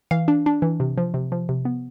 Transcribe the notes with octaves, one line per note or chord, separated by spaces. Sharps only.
E3 F5
D4
D4
E3
C3
F3
C3
F3
C3
B3